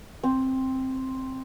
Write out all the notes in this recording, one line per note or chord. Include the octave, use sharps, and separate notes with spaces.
C4